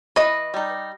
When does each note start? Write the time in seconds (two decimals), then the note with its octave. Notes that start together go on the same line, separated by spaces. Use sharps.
0.16 E3 B4 D#5
0.54 G3 D#4